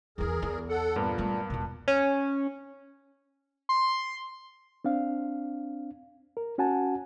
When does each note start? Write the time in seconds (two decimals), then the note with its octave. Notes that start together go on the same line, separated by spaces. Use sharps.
0.18 E2 E3 G#4 A#4
0.42 E2
0.69 A4 F#5
0.96 G2 A#2 A#3 B3
1.18 G3 A3
1.50 E1 B2
1.88 C#4
3.69 C6
4.85 C4 D4 F5
6.37 A#4
6.58 C#4 F#4 F#5 G#5 A5